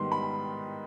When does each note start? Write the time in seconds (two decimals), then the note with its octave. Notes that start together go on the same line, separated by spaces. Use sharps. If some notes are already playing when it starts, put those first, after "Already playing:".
Already playing: G#2 D#3 G3 B3 C6
0.12 B5